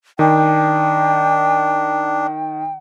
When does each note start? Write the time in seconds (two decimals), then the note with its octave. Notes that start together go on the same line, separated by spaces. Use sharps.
0.19 D#3 D4 G5